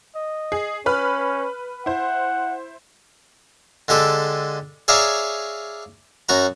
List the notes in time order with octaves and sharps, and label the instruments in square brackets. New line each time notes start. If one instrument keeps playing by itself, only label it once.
[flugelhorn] D#5
[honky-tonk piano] G#4
[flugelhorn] C#4 [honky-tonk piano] B4 B5 F6
[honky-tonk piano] E4 C5 [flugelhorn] F#5
[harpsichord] D3 G#3 G4 A4
G#4 C#5 D5 E5 F5 A#5
F#2 F#4 A#5